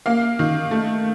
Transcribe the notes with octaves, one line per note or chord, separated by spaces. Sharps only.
A#3 F5
D#3
A3